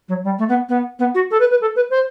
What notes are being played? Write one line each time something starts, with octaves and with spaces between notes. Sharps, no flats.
F#3
G3
A3
B3
B3
B3
F#4
A4
B4
B4
A4
B4
C5